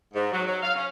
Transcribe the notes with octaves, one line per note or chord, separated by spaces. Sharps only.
G#2
F#3
F#3
F5
C#4